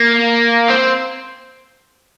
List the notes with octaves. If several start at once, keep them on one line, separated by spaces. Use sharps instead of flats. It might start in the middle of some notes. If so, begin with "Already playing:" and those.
Already playing: A#3
C4